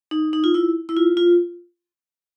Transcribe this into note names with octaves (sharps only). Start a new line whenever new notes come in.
D#4
D#4
F4
E4
E4
F4
F4